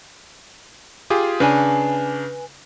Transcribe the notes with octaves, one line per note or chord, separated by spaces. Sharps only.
F4 G4 G#4
C#3 D4 B4 G#5